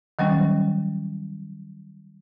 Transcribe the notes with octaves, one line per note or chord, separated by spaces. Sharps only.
D#3 F#3 G3 C#4